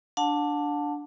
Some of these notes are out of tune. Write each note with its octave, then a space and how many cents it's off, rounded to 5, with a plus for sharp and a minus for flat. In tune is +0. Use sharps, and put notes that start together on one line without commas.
D4 +0 F#5 -45 A5 +5